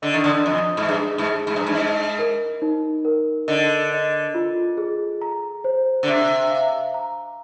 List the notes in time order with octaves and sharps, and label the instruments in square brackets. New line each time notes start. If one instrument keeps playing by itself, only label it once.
[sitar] D3 [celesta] D#5
[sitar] D#3
D3
[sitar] F2 [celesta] D#5
[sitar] G#2
[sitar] G2 [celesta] G#4
[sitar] G#2
[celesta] G#4
[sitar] G#2
G2
G#2
[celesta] D#5
A#4
D#4
A#4
[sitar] D3 [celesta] D#5
[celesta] D#5
F4
G#4
A#5
C5
[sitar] D3
[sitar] C3 [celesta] D6
[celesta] F5
A#5